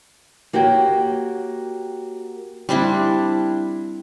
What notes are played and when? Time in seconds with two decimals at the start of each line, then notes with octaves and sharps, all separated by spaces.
0.53 A#3 F#4 G4 C#5 G5
2.69 G3 C4 D4 E4